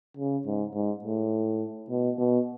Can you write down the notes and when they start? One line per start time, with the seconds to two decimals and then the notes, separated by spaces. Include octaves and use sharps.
0.17 C#3
0.46 G#2
0.74 G#2
1.04 A2
1.90 B2
2.18 B2